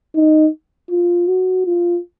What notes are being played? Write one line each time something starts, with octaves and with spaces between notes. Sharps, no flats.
D#4
F4
F#4
F4